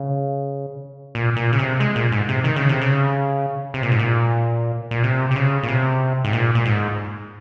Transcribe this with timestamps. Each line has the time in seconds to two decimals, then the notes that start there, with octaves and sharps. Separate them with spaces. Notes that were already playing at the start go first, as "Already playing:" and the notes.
Already playing: C#3
1.15 A#2
1.37 A#2
1.52 C#3
1.59 C3
1.80 G#3
1.96 A#2
2.12 G#2
2.29 C3
2.44 D#3
2.56 C#3
2.69 C3
2.81 C#3
3.74 C3
3.83 A#2
3.91 G#2
3.99 A#2
4.91 A#2
5.03 C3
5.31 C3
5.36 C#3
5.63 A#2
5.68 C3
6.25 G#2
6.33 A#2
6.55 A#2
6.65 G#2